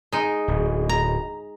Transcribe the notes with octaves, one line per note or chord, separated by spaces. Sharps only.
G#3 D#4
D1
A#5